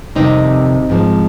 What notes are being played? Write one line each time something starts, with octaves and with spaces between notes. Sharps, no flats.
F2 C3 D#3 G3 C4 D#4
G#2 F3 G#3